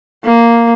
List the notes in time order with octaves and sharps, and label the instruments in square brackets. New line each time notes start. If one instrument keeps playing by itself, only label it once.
[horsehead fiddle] A#3